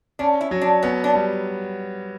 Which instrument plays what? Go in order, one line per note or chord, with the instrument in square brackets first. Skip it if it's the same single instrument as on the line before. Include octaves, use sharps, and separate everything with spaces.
[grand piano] C#4 [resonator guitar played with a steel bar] D4
[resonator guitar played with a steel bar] E4
[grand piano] F#3
[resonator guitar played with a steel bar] D4
[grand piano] B3 [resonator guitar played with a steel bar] C#4
[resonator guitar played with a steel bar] D4
[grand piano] G3